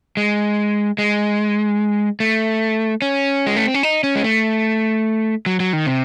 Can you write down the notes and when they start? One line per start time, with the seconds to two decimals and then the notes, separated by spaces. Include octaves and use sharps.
0.17 G#3
0.98 G#3
2.20 A3
3.02 C#4
3.47 G#3
3.56 A3
3.65 C4
3.74 C#4
3.83 D#4
4.03 C#4
4.16 G#3
4.24 A3
5.46 F#3
5.60 F#3
5.73 D#3
5.86 C3